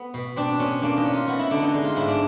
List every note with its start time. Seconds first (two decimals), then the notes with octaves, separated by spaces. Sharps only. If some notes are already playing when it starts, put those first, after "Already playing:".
Already playing: B3
0.14 B2
0.36 C4 D4
0.60 B2 C#4
0.82 A#3 D4
0.98 D#4
1.05 C#4
1.13 F4
1.28 B3 F#4
1.39 E4
1.50 D3 D4
1.63 D#4
1.73 G#3 D#4
1.85 F4
1.96 G#2 E4
2.08 D4